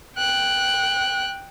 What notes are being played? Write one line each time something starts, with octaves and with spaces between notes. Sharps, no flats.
G5 F#6